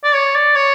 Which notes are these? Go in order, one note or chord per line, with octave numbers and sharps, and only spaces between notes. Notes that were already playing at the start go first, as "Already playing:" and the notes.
D5
C#5
D5
C#5